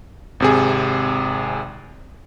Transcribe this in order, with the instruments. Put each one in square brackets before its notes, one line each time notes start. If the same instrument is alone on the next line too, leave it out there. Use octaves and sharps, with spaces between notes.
[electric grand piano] G#1 C3 G#4